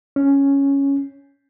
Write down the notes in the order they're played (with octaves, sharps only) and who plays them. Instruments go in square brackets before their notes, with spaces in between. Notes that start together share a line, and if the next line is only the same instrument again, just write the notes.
[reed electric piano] C#4